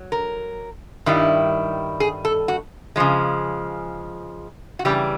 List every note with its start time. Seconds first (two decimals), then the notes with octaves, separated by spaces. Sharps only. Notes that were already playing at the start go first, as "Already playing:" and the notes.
Already playing: F#3
0.12 A#4
1.06 G2 D#3 G3 E4
2.00 G#4
2.25 A4
2.48 F#4
2.96 C#3 F3 G#3
4.79 F#4
4.85 C#3 E3 G3 G4